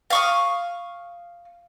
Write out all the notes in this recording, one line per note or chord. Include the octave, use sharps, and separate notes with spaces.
F5 C#6 D#6